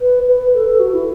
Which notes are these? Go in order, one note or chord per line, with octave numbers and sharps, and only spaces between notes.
B4
B4
A4
A4
F#4
E4